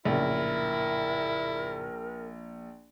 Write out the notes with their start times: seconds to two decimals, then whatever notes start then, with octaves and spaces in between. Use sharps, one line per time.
0.05 A#1 F#2 A2 C#3 E4 A#4